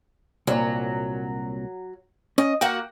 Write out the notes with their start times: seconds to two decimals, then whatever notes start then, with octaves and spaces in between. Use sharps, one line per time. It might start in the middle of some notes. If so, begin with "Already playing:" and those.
0.47 C2 A#2 F#3
2.38 C#4 D#5
2.61 A#3 F#4 F#5 G5